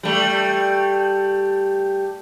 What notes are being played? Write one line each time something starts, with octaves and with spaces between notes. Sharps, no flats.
G3 A3